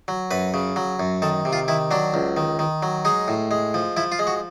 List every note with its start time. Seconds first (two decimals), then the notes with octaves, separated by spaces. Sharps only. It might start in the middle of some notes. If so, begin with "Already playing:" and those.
0.08 F#3
0.31 F#2 B4
0.54 C#3
0.76 F#3
0.99 F#2
1.22 D#3 A4
1.45 C3
1.53 F4
1.68 D#3 E4
1.91 F#3 D4
2.14 C#2
2.37 D#3
2.59 D#3
2.83 F#3
3.05 G#3 D#4
3.28 A2
3.51 G#3
3.74 F3
3.97 F3 E4
4.12 F4
4.19 G#3
4.27 F#4